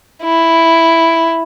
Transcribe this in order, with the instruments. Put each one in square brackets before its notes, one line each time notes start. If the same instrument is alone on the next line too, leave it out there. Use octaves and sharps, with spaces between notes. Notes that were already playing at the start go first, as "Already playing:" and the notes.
[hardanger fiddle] E4